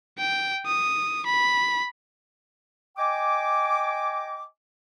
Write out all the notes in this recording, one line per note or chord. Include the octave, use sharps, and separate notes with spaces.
G5
D#6
B5
D#5 G5 G#5 D6